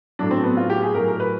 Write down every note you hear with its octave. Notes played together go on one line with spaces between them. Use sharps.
A2 F#3 D4
C4
B3
F4
G4
G#4
A2 F#3 A#4
A#4
B4